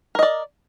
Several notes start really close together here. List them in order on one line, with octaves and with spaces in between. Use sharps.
A#4 D#5 D5